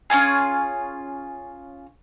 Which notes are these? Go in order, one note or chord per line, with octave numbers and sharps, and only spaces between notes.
C#4 E4 F4 G#4